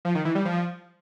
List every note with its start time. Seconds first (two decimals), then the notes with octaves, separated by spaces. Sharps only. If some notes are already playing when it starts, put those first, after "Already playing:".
0.05 F3
0.15 D#3
0.25 E3
0.35 G3
0.45 F3